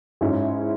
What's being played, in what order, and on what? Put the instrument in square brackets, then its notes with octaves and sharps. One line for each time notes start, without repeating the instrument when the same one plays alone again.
[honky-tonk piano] G#2 G#3 C#4 E4